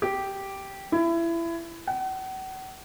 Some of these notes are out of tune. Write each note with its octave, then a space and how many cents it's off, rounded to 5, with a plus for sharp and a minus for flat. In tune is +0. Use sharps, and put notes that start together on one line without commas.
G4 -5
E4 +25
F#5 +40